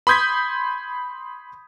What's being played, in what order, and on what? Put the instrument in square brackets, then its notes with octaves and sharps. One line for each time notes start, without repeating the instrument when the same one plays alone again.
[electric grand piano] B5 C6 D#6 G6 G#6 B6